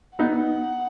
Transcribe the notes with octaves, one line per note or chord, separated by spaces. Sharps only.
B3 D#4 F#5